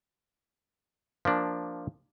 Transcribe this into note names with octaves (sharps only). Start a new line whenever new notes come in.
F3 A#3 D4